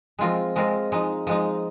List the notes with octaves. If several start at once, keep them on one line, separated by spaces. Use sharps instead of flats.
F3 G#3 C4 F4 A#4
F3 G#3 C4 F4 A#4
F3 G#3 D#4
F3 G#3 D#4